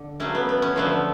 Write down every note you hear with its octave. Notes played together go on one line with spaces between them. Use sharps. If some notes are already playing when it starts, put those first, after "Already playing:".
Already playing: D3
C#3 F#3 A3 C#4
B3
B3
C#4
D3 F3 A3 B3